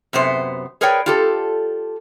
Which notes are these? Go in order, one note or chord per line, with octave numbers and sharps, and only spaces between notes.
F#2 C3 B3 C5
G#4 A#4 B4 C#5 D5 G5
F4 G4 A4